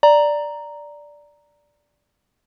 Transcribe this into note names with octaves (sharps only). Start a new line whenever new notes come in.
D5 A#5